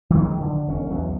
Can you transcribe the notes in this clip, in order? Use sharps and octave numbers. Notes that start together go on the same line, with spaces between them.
D#3 E3 F#3 G#3
D3
E1 C#4
B1 E2 F#3